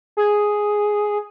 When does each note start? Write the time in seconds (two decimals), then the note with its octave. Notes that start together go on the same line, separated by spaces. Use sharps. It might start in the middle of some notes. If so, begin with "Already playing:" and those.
0.17 G#4